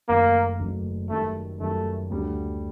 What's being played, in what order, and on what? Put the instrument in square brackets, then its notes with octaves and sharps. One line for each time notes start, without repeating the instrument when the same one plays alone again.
[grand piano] F#1 F#2 D#3 A3 [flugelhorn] A#3
[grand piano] F#1 F#2 D#3 A3
[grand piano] F#2 D#3 G3 [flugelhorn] A3
[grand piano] F#2 D#3 G3 [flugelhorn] A3
[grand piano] D2 D3 G3